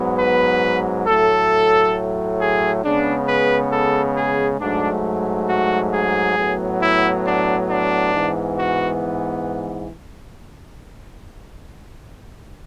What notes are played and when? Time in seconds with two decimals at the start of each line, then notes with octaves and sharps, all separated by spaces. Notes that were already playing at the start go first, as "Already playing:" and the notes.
Already playing: G#2 F#3 B3
0.18 B4
1.06 A2 F#3 A3 A4
2.40 G#4
2.83 C#3 G#3 B3 D4
3.28 B4
3.72 A4
4.16 G#4
4.60 G#2 F#3 A3 D4
5.49 F#4
5.92 G#4
6.37 A2 F#3 B3
6.81 E4
7.26 D4
7.70 D4
8.14 G#2 E3 B3
8.58 F#4